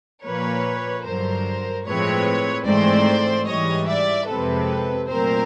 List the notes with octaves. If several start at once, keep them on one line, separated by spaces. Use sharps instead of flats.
A#2 F3 A#3 B4 C#5
G2 D3 F#3 A#4 C5
A2 F3 G#3 C4 B4 C#5
G#2 E3 A3 C4 C5 D5
G#2 E3 G3 C#5 D#5
D5 E5
F2 C3 F3 G#3 C4 A4 B4
A#2 F#3 A3 C4 A#4 C5